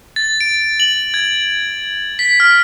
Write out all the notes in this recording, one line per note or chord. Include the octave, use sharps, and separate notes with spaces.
A6
D7
F#7
G#6
B6
F6